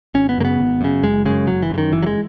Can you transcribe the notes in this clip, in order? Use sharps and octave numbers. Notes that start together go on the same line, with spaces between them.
G#1 C#4
B3
F#2 C#3 A#3
B3
G#1
F#2 C#3
F#1 G#3
F#2 C#3 G#3
F#1 F#3
E3
F#2 C#3
D#3
F#1 E3
F#3
G#3